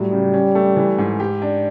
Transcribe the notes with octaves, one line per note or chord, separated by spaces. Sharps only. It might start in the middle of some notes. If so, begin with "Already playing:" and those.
Already playing: A2 F#3 G3
C#3
C#4
A3
E3
G#2
G4
D4